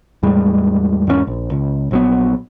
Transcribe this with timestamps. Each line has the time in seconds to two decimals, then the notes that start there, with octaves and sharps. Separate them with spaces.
0.23 E2 A2 G3 G#3
1.07 E2 G#2 A#3 C#4
1.27 A#1
1.51 C#2
1.91 A#1 F#3 B3